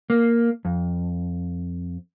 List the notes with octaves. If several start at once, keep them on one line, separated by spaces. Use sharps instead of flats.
A#3
F2